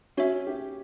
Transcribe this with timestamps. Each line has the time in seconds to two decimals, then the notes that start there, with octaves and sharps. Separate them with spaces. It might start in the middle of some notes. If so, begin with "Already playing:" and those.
0.17 C#4 F#4 C#5 E5
0.47 G4